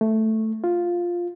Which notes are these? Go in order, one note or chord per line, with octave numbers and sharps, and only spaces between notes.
A3
F4